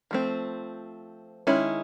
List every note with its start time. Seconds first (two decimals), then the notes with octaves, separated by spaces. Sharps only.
0.11 F3 A3 C4
1.47 D#3 G#3 C#4 E4